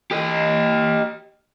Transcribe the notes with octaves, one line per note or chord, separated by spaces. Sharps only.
G4 D#5